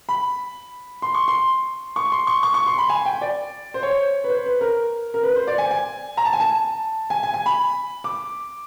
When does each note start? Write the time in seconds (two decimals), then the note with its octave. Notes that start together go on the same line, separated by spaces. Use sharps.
0.09 B5
1.02 C6
1.15 C#6
1.28 C6
1.96 C#6
2.12 C6
2.27 C#6
2.43 C#6
2.54 C#6
2.67 C6
2.78 B5
2.89 G#5
3.05 G5
3.21 D5
3.74 C5
3.83 C#5
4.24 B4
4.29 C5
4.46 B4
4.61 A#4
5.14 A#4
5.23 B4
5.35 C5
5.47 D5
5.58 G#5
5.71 G#5
6.17 A#5
6.25 A5
6.33 G#5
6.40 A5
7.10 G#5
7.23 G#5
7.34 G#5
7.46 B5
8.04 D6